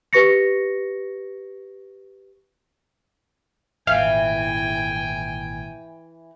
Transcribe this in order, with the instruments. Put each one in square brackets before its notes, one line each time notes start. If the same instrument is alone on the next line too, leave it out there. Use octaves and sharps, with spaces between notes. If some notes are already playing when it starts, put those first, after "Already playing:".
[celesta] G4 B4 C#6 A#6 C#7
[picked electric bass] G#1 A#2 [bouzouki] E3 [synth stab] F5 [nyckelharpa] G5 G#5